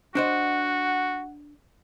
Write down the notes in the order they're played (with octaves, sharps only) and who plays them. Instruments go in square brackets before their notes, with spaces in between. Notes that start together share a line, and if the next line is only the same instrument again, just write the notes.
[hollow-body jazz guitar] D4 C5 D#5 [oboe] F#4 [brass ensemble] F#5